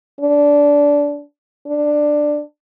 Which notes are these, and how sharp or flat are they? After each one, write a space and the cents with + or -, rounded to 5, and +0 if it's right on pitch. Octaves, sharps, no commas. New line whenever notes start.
D4 -15
D4 +10